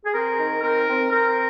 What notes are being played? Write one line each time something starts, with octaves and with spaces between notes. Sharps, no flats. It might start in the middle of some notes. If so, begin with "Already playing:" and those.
G#4
C4 A#4
D#3
C4 A#4
C4
C4 A#4